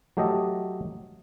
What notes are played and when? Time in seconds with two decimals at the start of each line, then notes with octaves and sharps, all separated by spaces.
0.17 F#3 A3 G4 A4 D#5